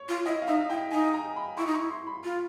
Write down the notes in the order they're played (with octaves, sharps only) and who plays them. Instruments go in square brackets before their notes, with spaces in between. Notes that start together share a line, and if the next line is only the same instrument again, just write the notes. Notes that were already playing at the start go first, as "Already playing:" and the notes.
Already playing: [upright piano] C#5
[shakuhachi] F4
[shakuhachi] E4 [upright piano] D#5
[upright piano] F5
[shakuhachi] D#4 [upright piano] E5
[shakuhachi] E4 [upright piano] G5
[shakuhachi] D#4 [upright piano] G#5
[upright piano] A#5
B5
[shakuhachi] E4 [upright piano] C#6
[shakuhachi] D#4
[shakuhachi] E4 [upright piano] C#6
[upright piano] C6
B5
[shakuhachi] F4